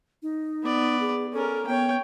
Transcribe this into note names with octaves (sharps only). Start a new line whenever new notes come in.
D#4
B3 D5
G#4
C#4 A4 A#4
B3 C#5 G5